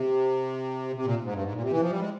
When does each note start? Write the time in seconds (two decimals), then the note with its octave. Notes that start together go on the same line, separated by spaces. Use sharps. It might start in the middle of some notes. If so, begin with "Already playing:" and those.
Already playing: C3
0.96 C3
1.05 A#2
1.24 G#2
1.33 G2
1.43 G#2
1.52 A#2
1.62 C3
1.71 E3
1.81 F3
1.90 G3
2.00 G#3